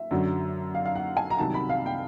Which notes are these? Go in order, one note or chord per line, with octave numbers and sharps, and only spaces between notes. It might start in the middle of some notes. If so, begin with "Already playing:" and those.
Already playing: E5
F#2 D3 F#3
F5
F5
F#5
G#5
A#5
C2 C3 D#3 F#3 A5
B5
F5
G5